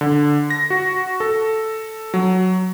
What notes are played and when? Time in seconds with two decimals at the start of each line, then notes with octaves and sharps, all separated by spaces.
0.01 D3
0.50 A#6
0.70 F#4
1.20 A4
2.14 F#3